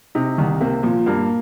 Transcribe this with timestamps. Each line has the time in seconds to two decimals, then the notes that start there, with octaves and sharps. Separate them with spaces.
0.15 C3 D#4
0.38 C2 D#3
0.61 C3 A#3
0.83 A#2 F3
1.06 G2 A#3